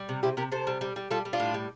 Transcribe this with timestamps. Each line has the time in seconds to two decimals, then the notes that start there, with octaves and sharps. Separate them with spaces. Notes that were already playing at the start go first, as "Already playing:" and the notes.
Already playing: G3
0.09 C3
0.23 C3 E4 G4
0.37 C3 G4 A#4
0.52 C3 A4 C5
0.67 G3
0.81 G3
0.96 G3
1.11 G3 F4 A4
1.25 G3
1.33 D4 F4
1.40 A2
1.54 G3